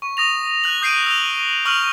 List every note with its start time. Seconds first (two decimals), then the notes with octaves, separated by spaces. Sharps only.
0.02 C#6
0.17 D#6 A#6 F7
0.64 F#6 F#7
0.81 D#6 G6 C7 D7 D#7
1.06 E6 F7 G7
1.65 C#6 E6 F6 F7 F#7